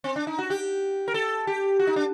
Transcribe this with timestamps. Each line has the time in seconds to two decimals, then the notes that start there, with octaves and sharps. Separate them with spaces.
0.04 C4
0.16 D4
0.27 D#4
0.39 F#4
0.50 G4
1.08 A#4
1.14 A4
1.47 G4
1.80 F#4
1.87 D#4
1.96 D4